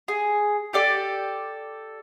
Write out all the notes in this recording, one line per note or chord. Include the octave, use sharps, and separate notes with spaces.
G#4
G4 A4 D5